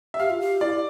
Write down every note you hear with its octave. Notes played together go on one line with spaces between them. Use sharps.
E5
G4 F5
F4
G4
E4 D5